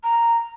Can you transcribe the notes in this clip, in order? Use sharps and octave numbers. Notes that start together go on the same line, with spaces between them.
A#5